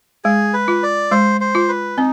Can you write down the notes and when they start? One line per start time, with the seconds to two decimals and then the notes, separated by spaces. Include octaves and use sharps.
0.24 G#3 G#4
0.54 B4
0.68 F4
0.83 D5
1.11 G#3 C5
1.41 C5
1.55 F4
1.69 B4
1.97 C4 D#4